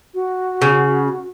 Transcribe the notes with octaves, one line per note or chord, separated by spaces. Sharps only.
F#4
C#3